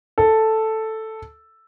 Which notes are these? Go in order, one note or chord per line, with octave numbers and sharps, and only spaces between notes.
A4